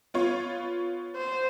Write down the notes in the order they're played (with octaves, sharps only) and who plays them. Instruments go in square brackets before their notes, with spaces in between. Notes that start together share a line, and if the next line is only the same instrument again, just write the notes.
[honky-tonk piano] B3 F4 C#5
[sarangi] C5